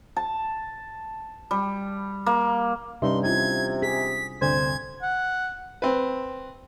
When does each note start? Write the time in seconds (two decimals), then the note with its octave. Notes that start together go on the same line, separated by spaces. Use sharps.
0.16 A5
1.51 G3
2.26 A#3
3.02 G2 C3 G3 C#4 D#4 E5 C6
3.23 C3 D4 E4 F4 G#6
3.82 G#4 B6
4.41 D2 G2 C3 C5 G#6
5.02 F#5
5.82 C4 B4